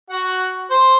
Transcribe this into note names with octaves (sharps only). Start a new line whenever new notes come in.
F#4 F#5
C5